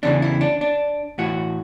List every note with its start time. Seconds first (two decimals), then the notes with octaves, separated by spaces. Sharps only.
0.03 E2 C#3 E3 D4
0.22 E4
0.41 D4
0.61 D4
1.18 A2 E3 F#4